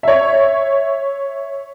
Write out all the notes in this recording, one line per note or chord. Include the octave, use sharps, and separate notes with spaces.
C#5 E5